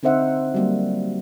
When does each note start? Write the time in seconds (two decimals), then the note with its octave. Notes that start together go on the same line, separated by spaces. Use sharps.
0.03 D3 C4 D#4 C5 E5 F#5
0.54 F#3 G3 A#3